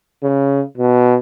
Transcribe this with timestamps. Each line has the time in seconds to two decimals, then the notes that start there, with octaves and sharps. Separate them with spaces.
0.23 C#3
0.78 B2